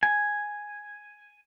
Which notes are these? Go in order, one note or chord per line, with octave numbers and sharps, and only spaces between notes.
G#5